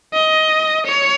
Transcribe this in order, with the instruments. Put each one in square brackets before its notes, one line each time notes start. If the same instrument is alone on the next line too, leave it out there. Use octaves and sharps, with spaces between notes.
[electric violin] D#5
C#5